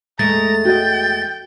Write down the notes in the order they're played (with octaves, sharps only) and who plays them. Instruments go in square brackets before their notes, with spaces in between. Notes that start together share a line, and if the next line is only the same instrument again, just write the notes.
[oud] E2 G#3 A3 [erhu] A#5 [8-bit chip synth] A6
[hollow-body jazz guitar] F#4 D#5 [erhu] G5